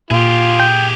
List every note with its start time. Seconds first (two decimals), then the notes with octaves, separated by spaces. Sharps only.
0.11 A#2 F4 G4 G#4 F5
0.60 G5